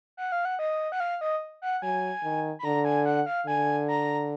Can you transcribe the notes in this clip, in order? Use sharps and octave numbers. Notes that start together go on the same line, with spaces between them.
F#5
F5
F#5
D#5
F#5
F5
D#5
F#5
F#3 G#5
D#3
B5
D3 A#5
G#5
F#5
F5
D3 G#5
A#5